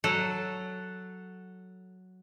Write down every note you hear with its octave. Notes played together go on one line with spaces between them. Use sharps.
F#3 A4 F#5